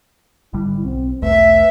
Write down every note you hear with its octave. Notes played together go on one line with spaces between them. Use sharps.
G#1 D3 G3 E4
B1 C4
B1 E2 A3 B4 E5